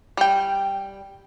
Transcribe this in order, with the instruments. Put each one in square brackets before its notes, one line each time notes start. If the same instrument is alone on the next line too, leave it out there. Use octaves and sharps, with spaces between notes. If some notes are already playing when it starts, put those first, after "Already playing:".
[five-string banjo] G3 G5